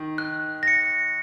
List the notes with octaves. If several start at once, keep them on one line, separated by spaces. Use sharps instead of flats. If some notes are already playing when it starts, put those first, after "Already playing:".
Already playing: D#3
F#6
A#6 C#7